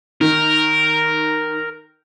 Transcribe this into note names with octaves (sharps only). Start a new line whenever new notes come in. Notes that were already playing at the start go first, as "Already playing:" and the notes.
D#3 A#4